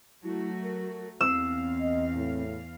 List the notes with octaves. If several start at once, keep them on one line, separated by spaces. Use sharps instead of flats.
F#3 A3 E4 F#4
A#4
E2 C4 F5 E6
D#5
A2